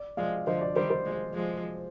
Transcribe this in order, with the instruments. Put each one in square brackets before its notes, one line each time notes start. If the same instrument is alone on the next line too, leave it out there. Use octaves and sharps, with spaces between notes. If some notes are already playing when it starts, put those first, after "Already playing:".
Already playing: [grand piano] D5
[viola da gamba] F3 G#3 [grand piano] D5 F5
[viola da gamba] D3 F3 [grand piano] C5 D#5
[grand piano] D5
[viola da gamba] D#3 G3 [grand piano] C5
[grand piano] C5
[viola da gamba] F3 G#3
F3 G#3